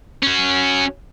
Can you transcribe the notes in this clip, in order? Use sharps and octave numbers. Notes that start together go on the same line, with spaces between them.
C#4 F#4